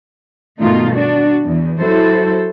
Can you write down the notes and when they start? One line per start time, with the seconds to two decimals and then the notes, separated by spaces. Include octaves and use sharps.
0.59 G2 B2 D#3 A3 D#4 F4
0.94 D4 F#4
1.45 E2
1.79 F#3 E4 F#4 A4 C5